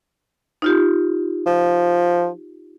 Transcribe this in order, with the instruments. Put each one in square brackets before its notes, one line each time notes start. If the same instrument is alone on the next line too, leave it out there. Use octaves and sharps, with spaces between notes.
[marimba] D#4 F4 G4
[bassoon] F3